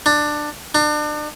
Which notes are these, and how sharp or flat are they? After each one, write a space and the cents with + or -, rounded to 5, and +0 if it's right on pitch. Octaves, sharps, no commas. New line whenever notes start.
D4 +15
D4 +35